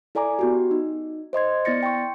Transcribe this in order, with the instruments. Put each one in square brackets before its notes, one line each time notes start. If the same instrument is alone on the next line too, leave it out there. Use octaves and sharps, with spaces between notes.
[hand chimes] E4 A4 D5 G#5 A#5 D6
B3 F#4 G4
D#4
C5 D#5 C6 G#6
B3 E4 D5 A6 A#6 C#7
G5 C6 C#6